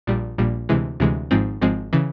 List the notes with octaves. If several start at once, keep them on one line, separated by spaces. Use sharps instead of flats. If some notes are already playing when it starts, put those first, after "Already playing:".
A#1 A#2 G3
A#1 A#2 G3
D2 C3 E3 G#3
D2 C3 E3 G#3
G#1 G#2 F3 G#3 C4
G#1 G#2 F3 G#3 C4
C#3 E3